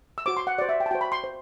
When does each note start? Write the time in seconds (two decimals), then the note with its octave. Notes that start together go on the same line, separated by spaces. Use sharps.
0.18 E6
0.26 F#4 C5 D6
0.37 C6
0.47 F#5
0.58 F#4 C5 D5
0.69 E5
0.80 G5
0.86 A5
0.91 F#4 C5 G5
1.01 B5
1.12 C6
1.24 C5